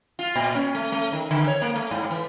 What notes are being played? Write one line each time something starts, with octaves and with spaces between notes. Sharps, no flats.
F4
A#2
C#4
A3
A3
D#3
D3
C#5
A#3
A3
G#2
E3